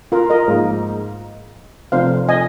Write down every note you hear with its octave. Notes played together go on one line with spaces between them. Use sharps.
F4 A#4
A#4 D#5
G#2 F3 A#3 D#4 G#4
F1 F2 C3 C5 F5
D#5 G#5